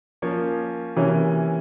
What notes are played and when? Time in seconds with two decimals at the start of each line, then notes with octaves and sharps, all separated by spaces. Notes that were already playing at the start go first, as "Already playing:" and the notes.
0.22 F3 A#3 C#4 C#5
0.96 C3 E3 A#3 C#4